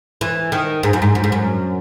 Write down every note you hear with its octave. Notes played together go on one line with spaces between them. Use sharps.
E3
D#3
G#2
F#2
G#2
F#2
G#2
F#2